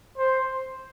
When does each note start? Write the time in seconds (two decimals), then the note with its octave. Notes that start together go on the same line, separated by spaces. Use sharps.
0.18 C5